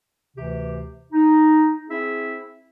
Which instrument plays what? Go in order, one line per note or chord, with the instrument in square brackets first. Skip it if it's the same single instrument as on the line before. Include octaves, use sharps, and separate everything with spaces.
[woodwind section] D2 C3 E3 G4
D#4
C4 E4 G#4 E5